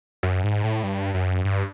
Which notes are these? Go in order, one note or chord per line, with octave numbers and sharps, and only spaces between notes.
F#2
G#2
A2
G2
F#2
G2